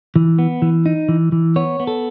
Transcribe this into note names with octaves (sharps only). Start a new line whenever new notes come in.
E3
B3
E3
D#4
E3
E3
B3 C#5
B3
A4